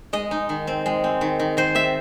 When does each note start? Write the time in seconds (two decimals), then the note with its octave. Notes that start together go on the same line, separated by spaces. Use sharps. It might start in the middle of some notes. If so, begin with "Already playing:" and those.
0.13 G#3 D#5
0.31 D#4
0.49 D#3
0.67 C4
0.86 G#3
1.04 C4
1.21 D#3
1.40 D#3
1.57 D#3 C5
1.75 C4 E5